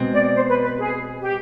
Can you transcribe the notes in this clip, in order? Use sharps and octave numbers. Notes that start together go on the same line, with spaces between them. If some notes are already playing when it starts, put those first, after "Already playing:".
Already playing: B2 G#3 C4
D5
C5
B4
B4
G#4
G4